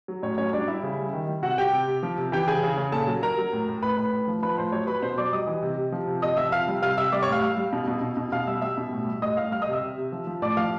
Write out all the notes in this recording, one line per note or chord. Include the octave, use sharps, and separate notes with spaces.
F#3
A2 C#4 C#5
F#3 C#4 C#5
G3 D4 D5
G3 E4 E5
C#3
G3
D#3
G3
C3 F#4 F#5
C3 G4 G5
C3
C3
F3
C3
E3 G4 G5
C#3 G#4 G#5
C#3
C#3
A#2 A4 A5
F#3
F#3 A#4 A#5
F#3
A2
A2
A2 B4 B5
A2 B4 B5
A2
F3
F3 B4 B5
A2 C5 C6
F#3 C#5 C#6
F#3 B4 B5
B2 C5 C6
F#3 D5 D6
G3 D#5 D#6
E3
C3
C3
F3
C3
C3 D#5 D#6
F3 E5 E6
C3 F5 F6
G3
C3 F5 F6
C3 E5 E6
G3 D5 D6
C#5 C#6
A2
F5 F6
G3 F5 F6
G3
B2
B2
B2
B2
B2 F5 F6
G3 E5 E6
G3 E5 E6
B2
A2
G3
A2 D#5 D#6
A2 F5 F6
G3 F5 F6
D#5 D#6
C3
E5 E6
C3
C3
F3
F3
A2 D5 D6
F3 F5 F6